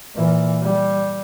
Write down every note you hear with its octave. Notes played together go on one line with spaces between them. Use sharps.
A#2 E3
G3